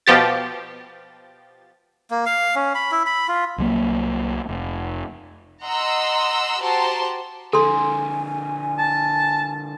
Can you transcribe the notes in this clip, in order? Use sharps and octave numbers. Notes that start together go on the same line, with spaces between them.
B2 F3 G4 A6
A#3
F5
C#4
B5
E4
B5
F4
C2 F#3 A#3
F1
D#5 F#5 A#5 C6 E6
F#4 G4 C5 A5 A#5 C6
D3 F3 A4 G#5 C6
A5